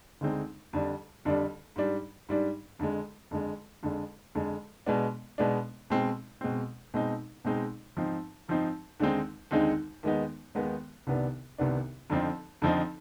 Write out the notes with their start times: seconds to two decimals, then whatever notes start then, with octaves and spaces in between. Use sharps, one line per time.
0.21 D2 D3 G#3 C4 D#4
0.73 F2 D3 G3 D4
1.25 F2 D3 G3 D4
1.76 G#2 G3 D4
2.29 G#2 G3 D4
2.79 F2 D3 G#3
3.31 F2 D3 G#3
3.83 F2 D3 G#3
4.35 F2 D3 G#3
4.86 B2 G#3 B3 D4
5.38 B2 G#3 B3 D4
5.90 B2 G#3 C4
6.41 B2 G#3 C4
6.94 B2 G#3 C4 D#4
7.45 B2 G#3 C4 D#4
7.97 G#2 F3 C4 D#4
8.48 G#2 F3 C4 D#4
9.00 D#2 D3 G#3 C4 D#4
9.51 D#2 D3 G#3 C4 D#4
10.03 D#2 D#3 G#3 B3 D#4
10.55 D#2 D#3 G#3 B3 D#4
11.07 C2 C3 D#3 B3 D4
11.58 C2 C3 D#3 B3 D4
12.10 F2 D3 F3 C4 D#4
12.62 F2 D3 F3 C4 D#4